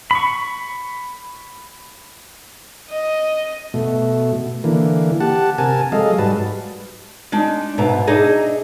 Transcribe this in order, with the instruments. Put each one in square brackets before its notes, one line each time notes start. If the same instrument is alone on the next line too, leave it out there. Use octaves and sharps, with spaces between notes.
[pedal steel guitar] B5 C#6
[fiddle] D#5
[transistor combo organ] B2 A3
D3 E3 A#3
G4 F#5 A5
C3 A#4 G#5 A5
F#3 G#3 A4 D#5 F5
G#2 G3 F#4 B4 A5
[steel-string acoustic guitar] G#3 D4 D#4
G#2 B2 E5 A#5
D4 D#4 G#4 D#5 E5